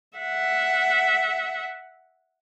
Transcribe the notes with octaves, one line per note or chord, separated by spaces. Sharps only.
E5 F#5